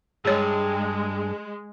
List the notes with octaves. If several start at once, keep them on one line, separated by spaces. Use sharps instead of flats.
G2 G#3 G#4 C#5